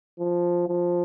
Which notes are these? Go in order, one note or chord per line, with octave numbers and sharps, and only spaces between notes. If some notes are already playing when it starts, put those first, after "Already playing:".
F3
F3